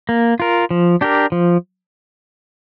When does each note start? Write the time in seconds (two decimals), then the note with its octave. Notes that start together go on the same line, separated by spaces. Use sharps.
0.09 A#3
0.40 F4 A#4
0.71 F3
1.01 D4 G4 A#4
1.32 F3